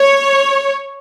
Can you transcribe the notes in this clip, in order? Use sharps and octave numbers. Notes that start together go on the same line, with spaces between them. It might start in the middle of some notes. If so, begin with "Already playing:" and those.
Already playing: C#5